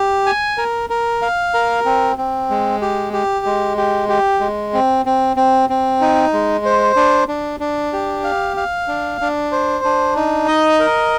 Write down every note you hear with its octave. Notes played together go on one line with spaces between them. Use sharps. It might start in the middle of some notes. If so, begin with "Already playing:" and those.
Already playing: G4
G#5
A#4
A#4
F5
A#4
C4
C4
G#3
G4
G4
G#3
G4
G4
G#3
C4
C4
C4
C4
D#4
G#3
C5
D4
D4
D4
G4
F5
F5
D4
D4
C5
D4
D#4
D#5
A#4